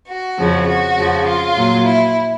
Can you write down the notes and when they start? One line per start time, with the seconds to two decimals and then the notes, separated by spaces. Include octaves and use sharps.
0.09 F#4
0.38 F2 C#3 F3
0.68 F#4
0.98 F2 C#3 F3
1.27 F4
1.57 A#2 F#3
1.86 E4